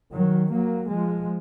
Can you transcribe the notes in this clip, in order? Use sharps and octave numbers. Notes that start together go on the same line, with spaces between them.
D#3 F#3
F#3 A#3
F3 G#3